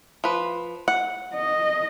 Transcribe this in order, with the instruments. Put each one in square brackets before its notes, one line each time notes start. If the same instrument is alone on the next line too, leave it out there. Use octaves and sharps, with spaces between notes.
[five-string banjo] F3 B4
F#5
[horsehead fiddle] D#5